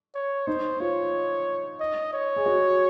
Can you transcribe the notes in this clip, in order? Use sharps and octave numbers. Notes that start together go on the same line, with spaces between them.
C#5
D#4 C5
F4 C#5
D#5
C#5
G#4
F#4